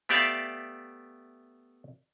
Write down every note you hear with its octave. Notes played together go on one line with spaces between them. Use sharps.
A3 B3 G4 D5 E5 F5